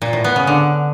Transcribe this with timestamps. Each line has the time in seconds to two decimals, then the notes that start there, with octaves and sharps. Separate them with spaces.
0.02 A#2
0.13 A2
0.24 B3
0.36 C#3
0.47 D3